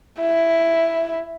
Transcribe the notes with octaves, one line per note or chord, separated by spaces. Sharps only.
E4